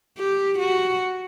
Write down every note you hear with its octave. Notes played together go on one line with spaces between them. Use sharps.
G4
F#4